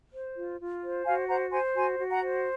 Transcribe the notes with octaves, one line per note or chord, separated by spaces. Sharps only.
C5
F4
F4
C5
F#4 F5 G#5
C5 F#5 A#5
C5 G#5 C6
F#4 G#5 C6
F#4
F#5 A#5
C5